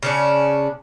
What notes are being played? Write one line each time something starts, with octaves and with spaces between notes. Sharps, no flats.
C#3 C#4 D4